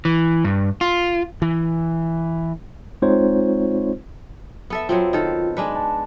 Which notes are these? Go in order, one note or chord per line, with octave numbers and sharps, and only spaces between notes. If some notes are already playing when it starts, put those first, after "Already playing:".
E3
G2
F4
E3
G#3 C4 D#4 F4 C5 C#5
B3 A4 E5
F#3 B3 C4 F4
D#3 A4
G#3 D4 B4
A5